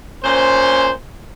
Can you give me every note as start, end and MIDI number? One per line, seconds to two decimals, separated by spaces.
0.23 0.89 46
0.23 0.89 61
0.23 0.89 72